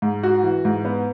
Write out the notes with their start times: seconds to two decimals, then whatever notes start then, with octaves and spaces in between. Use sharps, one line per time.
0.02 G#2
0.23 F#4
0.43 E3
0.65 G#2
0.85 B3